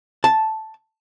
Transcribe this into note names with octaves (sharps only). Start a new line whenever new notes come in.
A5